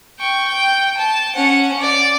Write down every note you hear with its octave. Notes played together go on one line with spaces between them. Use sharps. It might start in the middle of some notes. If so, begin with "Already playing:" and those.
G5 C#6
G5
A5
C#4 F#5
D5